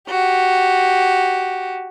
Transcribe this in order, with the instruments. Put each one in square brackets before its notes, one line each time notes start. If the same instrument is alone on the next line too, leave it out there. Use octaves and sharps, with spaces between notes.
[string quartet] F#4 G4